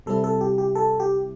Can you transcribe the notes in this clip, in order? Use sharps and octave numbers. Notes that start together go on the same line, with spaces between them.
C3 G3 C4 E4 A4
A4
G4
G4
A4
G4